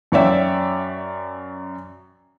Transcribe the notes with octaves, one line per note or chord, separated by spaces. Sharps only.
F#2 C#5 D5 E5 G5